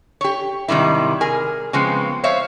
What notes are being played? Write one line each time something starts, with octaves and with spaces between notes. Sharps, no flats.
G4 C#5
G#2 C3 D#3 G3 E4
G#4 A#4 G#5
C#3 F3 G#3 B3 C4
C5 C#5 E5 F5